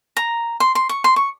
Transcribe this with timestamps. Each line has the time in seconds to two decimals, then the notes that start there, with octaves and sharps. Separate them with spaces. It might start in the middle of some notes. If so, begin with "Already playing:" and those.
0.17 A#5
0.60 C6
0.75 C6
0.89 C#6
1.04 C6
1.16 C#6